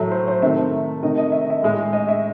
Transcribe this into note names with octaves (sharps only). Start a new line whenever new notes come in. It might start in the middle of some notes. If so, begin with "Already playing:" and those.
Already playing: A2 F#3 A3
C5
C5
C3 D#3 A3 E5
C3 D#3 A3 D#5
D#5
E5
D#5
E5
A2 G#3
D#5
E5